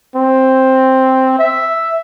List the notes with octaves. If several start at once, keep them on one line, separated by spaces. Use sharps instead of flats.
C4
E5